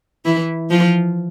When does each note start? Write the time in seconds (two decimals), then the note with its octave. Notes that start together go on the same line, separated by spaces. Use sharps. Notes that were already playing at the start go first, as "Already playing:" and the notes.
0.25 E3 E4
0.70 F3 F4